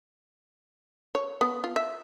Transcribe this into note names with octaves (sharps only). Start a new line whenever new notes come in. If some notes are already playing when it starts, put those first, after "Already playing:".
C#5
B3
F4
E5